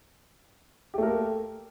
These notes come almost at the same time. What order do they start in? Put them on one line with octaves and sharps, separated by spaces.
G4 A3 A#4 A#3